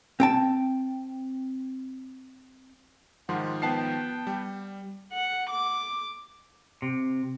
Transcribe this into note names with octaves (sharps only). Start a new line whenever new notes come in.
C4 G5 A5
G#2 D#3 F3 F#5 C6
B3 G5 A5 C7
G3
F#5
D6
C3